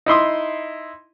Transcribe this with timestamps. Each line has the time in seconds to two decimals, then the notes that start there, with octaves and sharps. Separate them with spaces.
0.06 D#4 E4 C6 D#6